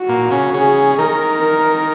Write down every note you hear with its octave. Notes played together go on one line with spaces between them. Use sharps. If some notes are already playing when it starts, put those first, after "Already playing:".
Already playing: F#4
A#2 A#3
C#3 C#4
C#3 C#4 G#4
D#3 D#4 A#4
A#4